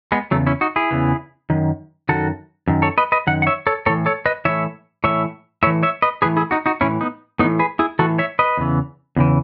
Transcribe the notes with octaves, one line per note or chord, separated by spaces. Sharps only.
G#3 B3
E2 C#3 F#3 A3
C#4 E4
D#4 F#4
E4 G#4
E2 C#3 E3
F#2 D#3
F#2 D#3 F#4 A4
F#2 D#3
A4 C#5
B4 D#5
B4 D#5
F#2 D#3 F#5
F#5
C#5 E5
A4 C#5
A2 E3 A4 C#5
A4 C#5
B4 D#5
A2 E3 C#5 E5
A2 E3 C#5 E5
A2 E3 C#5 E5
C#5 E5
B4 D#5
A2 E3 G#4 B4
E4 G#4
D#4 F#4
D#4 F#4
A2 E3 C#4 E4
B3 D#4
A2 E3 B3 D#4
G#4 B4
E4 G#4
A2 E3 F#4 A4
C#5 E5
B4 D#5
E2 C#3 E3
E2 C#3 E3